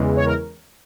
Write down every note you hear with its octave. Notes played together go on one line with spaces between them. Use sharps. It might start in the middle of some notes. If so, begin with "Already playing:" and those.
Already playing: E2 C#3 E3 G#3
C#5
A#4